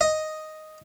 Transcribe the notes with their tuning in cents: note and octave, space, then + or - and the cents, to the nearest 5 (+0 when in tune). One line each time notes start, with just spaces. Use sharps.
D#5 +0